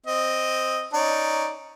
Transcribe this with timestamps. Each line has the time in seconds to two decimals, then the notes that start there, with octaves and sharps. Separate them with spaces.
0.07 C4 D#5
0.93 C#4 D#4 D5